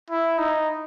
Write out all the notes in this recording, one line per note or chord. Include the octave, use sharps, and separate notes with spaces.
E4
D#4